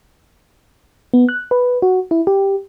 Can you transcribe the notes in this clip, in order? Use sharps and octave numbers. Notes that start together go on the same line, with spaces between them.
B3
F#6
B4
F#4
E4
G4